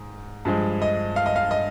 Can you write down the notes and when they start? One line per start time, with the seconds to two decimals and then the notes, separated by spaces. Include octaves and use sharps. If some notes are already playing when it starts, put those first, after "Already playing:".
Already playing: G#2
0.45 G2 F3 G#3
0.82 D#5
1.16 F5
1.26 D#5
1.36 F5
1.51 D#5